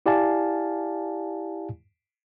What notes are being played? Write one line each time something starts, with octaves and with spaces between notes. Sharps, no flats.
E4 G4 D5 F5 G#5 A5